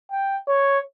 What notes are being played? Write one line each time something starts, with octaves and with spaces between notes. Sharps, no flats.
G5
C#5